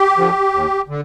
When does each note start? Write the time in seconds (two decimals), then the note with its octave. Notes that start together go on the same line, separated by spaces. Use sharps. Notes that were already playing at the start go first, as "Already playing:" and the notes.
Already playing: G4
0.18 D3 F3
0.54 D#2
0.88 D3